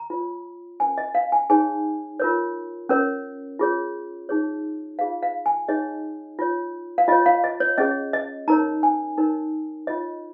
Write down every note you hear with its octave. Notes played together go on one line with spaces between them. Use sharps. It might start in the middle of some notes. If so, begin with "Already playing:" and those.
Already playing: A#5
F4 C#5
C#4 A#4 C#5 G#5
D#5
F5
G#5
D#4 G#4 C#5 G#5
F4 A#4 C#5
C#4 A#4 C#5
F4 G#4 C#5
D#4 G#4 C#5
F4 G#4 C#5 F5
F5
G#5
D#4 G#4 C#5 D#5
F4 C#5
F5
F4 C#5 D#5
F5
D#5
C#5
C#4 G#4 C#5 D#5
D#5
D#4 A#4 C#5 A#5
G#5
D#4 A#4 C#5
F4 C#5 D#5